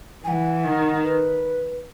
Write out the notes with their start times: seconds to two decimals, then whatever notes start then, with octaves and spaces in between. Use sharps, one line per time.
0.24 E3 G#5
0.28 F#5
0.64 D#3
1.03 B4